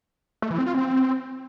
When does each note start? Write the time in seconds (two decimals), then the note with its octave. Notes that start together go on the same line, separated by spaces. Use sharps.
0.42 A3
0.50 E3
0.58 C4
0.66 F4
0.74 C4